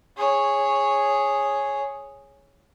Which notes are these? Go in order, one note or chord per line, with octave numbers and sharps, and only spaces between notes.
G#4 C#5